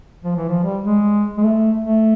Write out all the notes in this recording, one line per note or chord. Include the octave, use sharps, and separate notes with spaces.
F3
E3
F3
G3
G#3
G#3
A3
A3